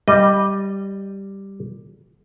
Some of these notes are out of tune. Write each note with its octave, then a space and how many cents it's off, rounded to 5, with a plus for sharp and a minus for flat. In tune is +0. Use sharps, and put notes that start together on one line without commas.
G3 +0 D#5 -15